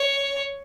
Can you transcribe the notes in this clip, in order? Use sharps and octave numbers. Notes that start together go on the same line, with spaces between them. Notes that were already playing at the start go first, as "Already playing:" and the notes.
Already playing: C#5